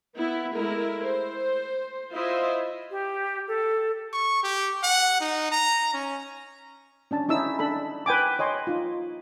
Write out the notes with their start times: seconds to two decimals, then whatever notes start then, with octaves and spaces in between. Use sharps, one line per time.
0.16 B3 E4
0.53 G#3 A3 E4 A#4
1.03 C5
2.12 E4 F4 C5 D#5 E5
2.91 G4
3.48 A4
4.13 C#6
4.43 G4
4.83 F#5
5.21 D#4
5.52 A#5
5.94 C#4
7.11 C#4 D4 A5
7.29 C#4 D#4 E4 E6
7.59 D4 A4 B5
8.06 B4 G5 G#5 D6
8.39 C#5 D#5 G#5 C6
8.67 D#4 F4